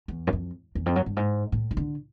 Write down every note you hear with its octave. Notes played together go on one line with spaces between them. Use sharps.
E2
F#2
F2
E2
F2
F#2
G2
G#2
A2
D#3
D3